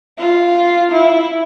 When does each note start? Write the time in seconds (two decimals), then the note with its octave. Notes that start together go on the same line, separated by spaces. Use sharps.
0.19 F4
0.92 E4